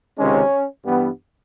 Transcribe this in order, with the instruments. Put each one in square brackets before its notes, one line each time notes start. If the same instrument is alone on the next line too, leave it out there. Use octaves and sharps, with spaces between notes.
[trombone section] C#2 C3 D#3 G#3 C#4
G2 E3 G3 B3